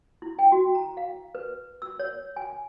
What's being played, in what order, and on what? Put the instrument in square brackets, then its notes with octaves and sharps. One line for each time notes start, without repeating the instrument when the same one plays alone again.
[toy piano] E4
G5
F#4
A#5
F5
B4
E6
C#5
G#5